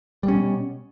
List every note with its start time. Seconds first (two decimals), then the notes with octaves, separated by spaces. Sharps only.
0.23 G3
0.28 C#4
0.33 B2